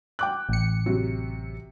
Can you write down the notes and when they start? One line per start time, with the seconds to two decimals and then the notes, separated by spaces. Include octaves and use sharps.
0.19 G5 D6 F#6
0.49 A1 C#7
0.86 C3 F#3